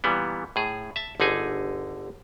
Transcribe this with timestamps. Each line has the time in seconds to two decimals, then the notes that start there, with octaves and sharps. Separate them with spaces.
0.04 A#2 E3 G3 B3
0.56 A2 G#4
0.96 E5 A5
1.20 G1 D3 D#4 G#4 G#5